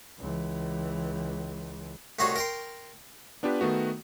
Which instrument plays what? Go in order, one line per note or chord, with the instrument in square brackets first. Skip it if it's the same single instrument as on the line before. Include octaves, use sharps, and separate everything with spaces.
[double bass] C#2 E3
[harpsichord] C2 A3 D#4 F#4 C#5 C6
A#4 G5 C6
[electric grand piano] B3 D4 F4 G4 B4
D#3 A3 B3 F#4